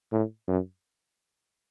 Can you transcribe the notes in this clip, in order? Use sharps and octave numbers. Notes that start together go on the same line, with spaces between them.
A2
F#2